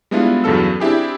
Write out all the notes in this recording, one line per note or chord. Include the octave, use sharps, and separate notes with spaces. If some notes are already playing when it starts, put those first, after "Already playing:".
G3 G#3 B3 D4 E4 F4
E2 G2 C#3 F#3 A4 E6
C4 D4 E4 G4 G#4